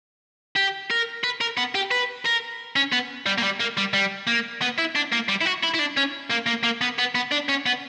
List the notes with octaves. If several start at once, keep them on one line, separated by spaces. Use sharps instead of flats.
G4
A#4
B4
A#4
B3
G4
B4
A#4
C#4
B3
G3
A#3
G3
A#3
G3
G3
A#3
B3
E4
D4
A#3
G3
E4
F#4
E4
E4
D4
C#4
A#3
A#3
A#3
B3
B3
B3
D4
C#4
B3